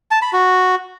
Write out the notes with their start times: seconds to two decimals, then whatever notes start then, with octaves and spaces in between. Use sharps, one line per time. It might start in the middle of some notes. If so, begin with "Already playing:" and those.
0.11 A5
0.22 B5
0.33 F#4